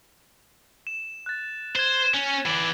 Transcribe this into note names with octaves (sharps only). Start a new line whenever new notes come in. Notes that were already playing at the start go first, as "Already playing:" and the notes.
E7
F#6 A6
C5 G#6 E7 G7
C#4
E3 D5